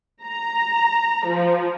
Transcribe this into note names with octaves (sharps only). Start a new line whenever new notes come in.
A#5
F3